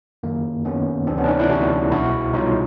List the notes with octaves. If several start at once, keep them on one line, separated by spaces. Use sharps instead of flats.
F#2 D#3 F#3 A#3
F#2 D#3 F#3 B3 C#4
D2 C3 E3 C4 D4
B3 C#4
D4
C#4 D#4
D4 E4
D2 C3 E3 E4 F#4
C2 B2 F#3 E4 F#4
C2 B2 F#3 D#4 F4